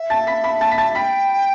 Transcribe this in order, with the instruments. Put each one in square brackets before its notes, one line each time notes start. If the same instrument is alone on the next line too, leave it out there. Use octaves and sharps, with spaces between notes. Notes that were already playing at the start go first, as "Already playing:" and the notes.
Already playing: [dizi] E5
[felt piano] A5 A6
B5 B6
B5 B6
A5 A6
B6
A5 A6
[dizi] G5 [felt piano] B5 B6